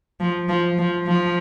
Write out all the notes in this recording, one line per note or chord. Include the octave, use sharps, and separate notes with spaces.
F3
F3
F3
F3